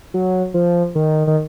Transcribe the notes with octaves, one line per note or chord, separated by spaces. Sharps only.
F#3
F3
D#3
D#3